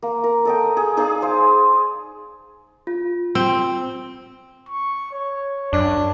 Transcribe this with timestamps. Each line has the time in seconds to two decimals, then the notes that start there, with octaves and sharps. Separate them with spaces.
0.02 A#3
0.24 A#4
0.45 A4 D#5 G5
0.77 G#4
0.97 D#4 G#4 D5 F5
1.22 C5 F5
2.87 F4
3.35 C4
4.69 C#6
5.12 C#5
5.73 F#2 D4